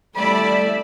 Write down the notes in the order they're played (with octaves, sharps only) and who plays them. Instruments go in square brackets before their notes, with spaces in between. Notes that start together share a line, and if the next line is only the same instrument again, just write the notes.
[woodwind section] G3 [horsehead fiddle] A3 E5 [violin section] E4 D5 [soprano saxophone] B5